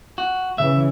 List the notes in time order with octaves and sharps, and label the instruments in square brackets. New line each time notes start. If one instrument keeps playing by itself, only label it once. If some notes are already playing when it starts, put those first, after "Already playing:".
[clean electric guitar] F#4
[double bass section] C#3 E3 [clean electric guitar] E5